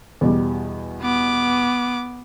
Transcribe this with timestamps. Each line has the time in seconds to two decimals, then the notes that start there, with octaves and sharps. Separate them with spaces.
0.21 E2 B2 G3
1.02 B3 D6